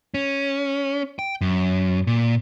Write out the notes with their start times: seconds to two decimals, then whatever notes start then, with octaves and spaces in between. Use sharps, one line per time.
0.14 C#4
1.19 G5
1.41 F#2
2.07 A#2